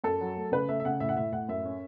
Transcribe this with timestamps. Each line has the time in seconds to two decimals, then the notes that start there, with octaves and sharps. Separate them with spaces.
0.04 F#2 A4
0.21 F#3
0.37 A3
0.52 C#3 B4
0.69 A3 E5
0.80 E5
0.85 C#3 F#5
1.00 A2 E5
1.09 F#5
1.17 A2 E5
1.32 A2 F#5
1.48 F#2 E5
1.65 C#4